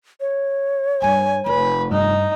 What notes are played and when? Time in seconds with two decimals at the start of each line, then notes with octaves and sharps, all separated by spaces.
0.20 C#5
1.02 G2 G3 G#5
1.46 F1 B4
1.91 G2 D#4